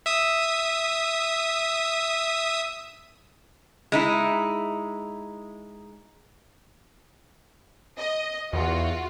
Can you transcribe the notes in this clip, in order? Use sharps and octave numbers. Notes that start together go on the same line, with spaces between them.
E5 D#6
G#3 D#4 E4
D#5
E2 F4 F#4